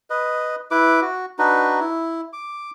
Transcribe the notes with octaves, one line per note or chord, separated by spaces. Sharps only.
B4 D#5
E4 B4 D6
F#4
D4 D#4 F#4 B4
E4
D6